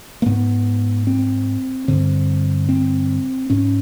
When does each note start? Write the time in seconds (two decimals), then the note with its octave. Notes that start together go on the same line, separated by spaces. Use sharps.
0.22 A#3
0.26 G#2 B3
1.07 C4
1.88 G2 D3 C4
2.69 C4
3.50 G#2 C#4